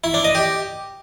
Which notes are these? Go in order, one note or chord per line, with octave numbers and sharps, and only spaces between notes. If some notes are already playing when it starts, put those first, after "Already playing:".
E4
D4
D#5
G4